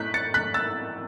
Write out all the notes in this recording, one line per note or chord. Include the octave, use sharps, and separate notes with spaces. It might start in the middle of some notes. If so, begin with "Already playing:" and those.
Already playing: A2 A3 F#6 B6
A6 C#7
F#6 B6
E6 A6